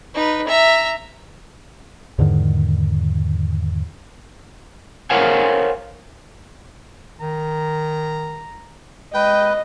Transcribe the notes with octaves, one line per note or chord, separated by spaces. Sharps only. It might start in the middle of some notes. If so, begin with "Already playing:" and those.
D#4 B4
E5 A#5
E2 G#2 D3 D#3
A#4 C5 C#5 F5 F#5 G#5
D#3 A#5
G#3 B4 D#5 G5